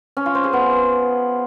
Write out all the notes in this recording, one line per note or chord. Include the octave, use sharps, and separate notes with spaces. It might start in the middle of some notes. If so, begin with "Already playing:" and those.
C#4
F4
C5
G#4
B3